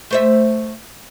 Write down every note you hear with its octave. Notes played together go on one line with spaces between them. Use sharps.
A3 C5 E5